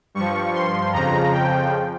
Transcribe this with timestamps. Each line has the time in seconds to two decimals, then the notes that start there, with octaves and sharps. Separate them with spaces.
0.15 G2 F3 C#6
0.54 C6
0.93 F2 C#3 F3 A#5
1.32 G5